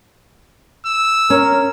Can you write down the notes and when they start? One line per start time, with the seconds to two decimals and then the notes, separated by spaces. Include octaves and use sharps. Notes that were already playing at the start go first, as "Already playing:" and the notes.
0.86 E6
1.30 C#4 A#4